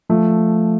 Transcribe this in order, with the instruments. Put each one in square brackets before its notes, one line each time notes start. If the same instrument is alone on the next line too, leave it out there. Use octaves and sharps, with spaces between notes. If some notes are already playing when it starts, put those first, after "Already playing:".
[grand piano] F3 A3